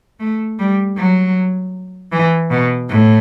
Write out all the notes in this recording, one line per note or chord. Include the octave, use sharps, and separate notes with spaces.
A3
G3
F#3
E3
B2
A2